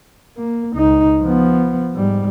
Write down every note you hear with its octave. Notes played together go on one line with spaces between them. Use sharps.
A#3
C#2 D#4
F3 B3
G#2 G3